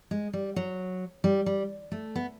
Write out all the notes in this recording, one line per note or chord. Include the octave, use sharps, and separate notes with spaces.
G#3
G3
F#3
G3
G3
A3
B3